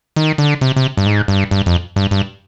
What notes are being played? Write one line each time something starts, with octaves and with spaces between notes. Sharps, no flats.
D#3
D3
C3
C3
G2
G#2
G2
G2
F2
G2
G2